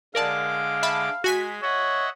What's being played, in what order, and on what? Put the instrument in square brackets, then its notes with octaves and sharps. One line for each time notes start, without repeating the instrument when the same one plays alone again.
[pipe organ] D3 G#3 D6 [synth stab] A#4 D5 A5 [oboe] F5
[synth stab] E5 A5 B5
[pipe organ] G#3 [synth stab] F#4 G#5 B6
[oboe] C#5 [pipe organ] D#5 E5 F#5